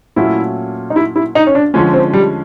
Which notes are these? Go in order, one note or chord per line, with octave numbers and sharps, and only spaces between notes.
A#2 F#3 A3 C#4 E4 F#4
D#4
E4
E4
D#4
C#4
D4
D3 F3 G#3 C#4
C4
G3